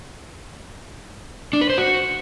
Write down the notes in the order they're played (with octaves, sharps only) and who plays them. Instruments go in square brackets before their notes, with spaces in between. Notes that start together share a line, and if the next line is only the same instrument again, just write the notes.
[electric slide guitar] D4
B4
C5
F#4